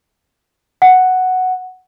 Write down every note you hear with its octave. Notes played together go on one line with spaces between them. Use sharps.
F#5